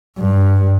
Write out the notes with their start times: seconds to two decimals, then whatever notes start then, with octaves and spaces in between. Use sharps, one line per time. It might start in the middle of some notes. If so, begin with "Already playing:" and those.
0.19 G2